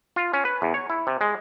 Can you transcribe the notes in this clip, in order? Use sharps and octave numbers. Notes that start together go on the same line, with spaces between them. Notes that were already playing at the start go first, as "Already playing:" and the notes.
F4
C#4
B4
E2
C#5
E4
C3
G#3